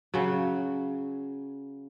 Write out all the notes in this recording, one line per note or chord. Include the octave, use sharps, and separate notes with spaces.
C#3 F#3